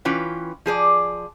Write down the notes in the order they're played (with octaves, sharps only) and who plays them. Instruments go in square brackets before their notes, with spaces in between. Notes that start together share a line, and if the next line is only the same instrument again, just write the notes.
[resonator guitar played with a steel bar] E3 C#4 F4 B4 G5
F3 G#4 B4 D5